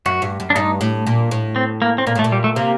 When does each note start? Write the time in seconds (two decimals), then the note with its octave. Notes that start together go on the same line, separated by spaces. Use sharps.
0.06 F#2 F#4
0.22 G2
0.40 F#2
0.50 D4
0.55 G2 D#4
0.81 A2
1.07 A#2
1.31 A2
1.56 C4
1.82 A#3
1.98 C4
2.07 A#2 A#3
2.15 A2
2.19 A3
2.24 A#2
2.32 G3
2.44 A3
2.56 C3 A#3